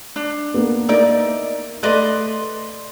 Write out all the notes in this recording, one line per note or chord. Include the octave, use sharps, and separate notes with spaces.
D4
A#3 B3
A#3 D#4 E4 A#4 D5
A3 B4 D5 D#5 C6